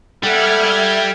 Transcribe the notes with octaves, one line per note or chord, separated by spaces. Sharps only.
G3 A4 E5 F#5 F6 G#6